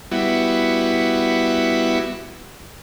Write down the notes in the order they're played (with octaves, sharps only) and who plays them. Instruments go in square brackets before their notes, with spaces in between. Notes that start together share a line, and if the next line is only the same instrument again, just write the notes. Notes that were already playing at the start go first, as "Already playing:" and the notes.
[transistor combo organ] G3 B3 E4 F#4